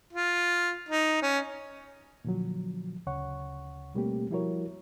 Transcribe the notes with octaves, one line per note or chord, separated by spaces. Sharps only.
F4
D#4
C#4
A#2 D3 F3 F#3
D2 C#3 C#5 F#5 C#6
B2 G3 A3 A#3 C4 G4
F3 G3 E4 F#4 A#4 C#5